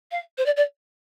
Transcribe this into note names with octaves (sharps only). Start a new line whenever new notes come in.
F5
C5
D5
D5